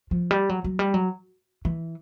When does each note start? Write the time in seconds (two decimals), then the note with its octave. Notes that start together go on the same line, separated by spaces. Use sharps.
0.11 F3
0.31 G3
0.49 F#3
0.64 F#3
0.79 G3
0.94 F#3
1.65 E3